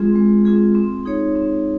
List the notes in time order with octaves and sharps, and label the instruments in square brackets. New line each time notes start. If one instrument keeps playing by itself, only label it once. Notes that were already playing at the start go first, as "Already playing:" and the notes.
Already playing: [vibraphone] G#3 C4 F4 G#4
G#3
C4 F4 G#4
C4
D#4 G#4 C#5
C4